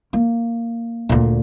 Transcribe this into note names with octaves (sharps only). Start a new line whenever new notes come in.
A#3
D2 A#2